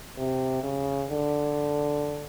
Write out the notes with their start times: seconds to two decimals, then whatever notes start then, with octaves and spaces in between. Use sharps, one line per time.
0.18 C3
0.64 C#3
1.10 D3